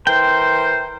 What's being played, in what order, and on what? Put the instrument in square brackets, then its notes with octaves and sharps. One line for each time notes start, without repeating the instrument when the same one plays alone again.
[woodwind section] E3 A#4 C5 [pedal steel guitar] G5